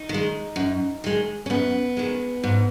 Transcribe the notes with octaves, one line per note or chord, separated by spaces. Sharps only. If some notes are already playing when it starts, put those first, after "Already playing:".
Already playing: D#4
D#3
G#3
F#2
D#3 G#3
C#4
F#2 B3
D#3 G#3
G#2